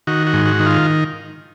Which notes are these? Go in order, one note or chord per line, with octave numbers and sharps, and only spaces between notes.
D#3 F#4
F#4
G#2
F#4
D#3
F4